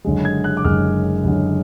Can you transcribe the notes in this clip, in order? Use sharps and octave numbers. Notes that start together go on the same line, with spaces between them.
F#1 F#2 D3 G#3
G#6
F#6
D6
F#1 F#2 D3 G#3 F6
F#1 F#2 D3 G#3